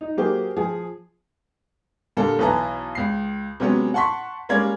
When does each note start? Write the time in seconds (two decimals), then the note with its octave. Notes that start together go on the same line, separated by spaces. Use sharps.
0.01 D#4
0.17 F#3 A#3 G4 G#4 C5
0.57 F3 G#4
2.17 A#2 D3 G3 A#3 A4
2.39 B1 E3 B4 A5 A#5
2.95 C#2 C7
3.60 C3 F#3 G#3 B3 C#4
3.94 F#5 A5 C6 C#6 B6
4.49 G3 G#3 A#3 C#4 D5 G#6